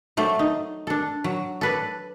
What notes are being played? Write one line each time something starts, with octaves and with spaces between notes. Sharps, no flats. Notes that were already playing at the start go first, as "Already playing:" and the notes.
F#3 A3 C5 D5
D#4
D4 A4
F#3
A4 B4 D5